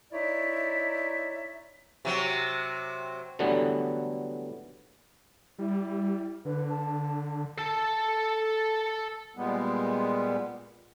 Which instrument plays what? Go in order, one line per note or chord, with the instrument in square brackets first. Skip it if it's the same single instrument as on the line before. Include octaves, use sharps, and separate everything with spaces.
[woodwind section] D#4 E4 C#5 D5 E5
[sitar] C3 F#3
[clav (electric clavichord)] D3 E3 F#3 G3 A3 B3
[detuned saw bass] G3 [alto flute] E4
[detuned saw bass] D3 [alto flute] B4
[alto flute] A5
[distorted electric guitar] A4 A5
[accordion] A#2 G3 G#3 B3